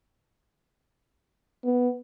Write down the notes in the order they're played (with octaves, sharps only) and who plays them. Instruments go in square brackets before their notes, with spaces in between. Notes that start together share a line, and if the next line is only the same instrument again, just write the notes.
[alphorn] B3